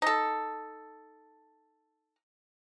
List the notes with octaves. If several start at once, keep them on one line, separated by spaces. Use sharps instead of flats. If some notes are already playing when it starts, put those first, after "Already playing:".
D#4 A4